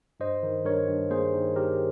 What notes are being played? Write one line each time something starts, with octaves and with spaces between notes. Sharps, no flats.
G2 C5 D#5
D#3
G2 A#4 C#5
G2
A#3 G#4 C5
D#3
D#3 G4 A#4